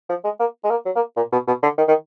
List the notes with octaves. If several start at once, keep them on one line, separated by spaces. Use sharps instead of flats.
F3
G#3
A#3
G#3
A#3
F#3
A#3
A#2
B2
B2
D3
D#3
D#3